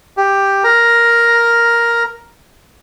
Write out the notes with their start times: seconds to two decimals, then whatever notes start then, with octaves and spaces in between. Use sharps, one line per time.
0.17 G4
0.64 A#4 A#5